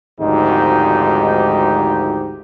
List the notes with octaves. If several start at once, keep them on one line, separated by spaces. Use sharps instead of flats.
G#1 D2 G#2 F3 D#4 G4